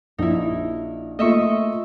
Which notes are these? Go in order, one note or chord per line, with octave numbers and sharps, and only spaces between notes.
A#1 D#4 E4
A3 A#3 F4 D#5 E5 C#6